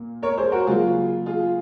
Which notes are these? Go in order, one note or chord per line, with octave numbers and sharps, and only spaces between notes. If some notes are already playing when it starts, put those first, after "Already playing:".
Already playing: A#2 A#3
A#4 C#5
G#4 C5
F#4 A#4
C#3 F#3 A#3 F4 G#4
F4 G#4